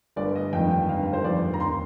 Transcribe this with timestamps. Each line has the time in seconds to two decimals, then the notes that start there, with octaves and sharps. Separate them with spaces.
0.16 G1 D5
0.35 D#5
0.53 F2 D#3 G5
0.71 G5
0.88 G1 F5
1.13 C5
1.24 F2 D#3 D5
1.54 A#5
1.60 D#2 C6